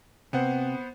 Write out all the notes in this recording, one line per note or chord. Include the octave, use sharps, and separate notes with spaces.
C3 B3 C5 F#5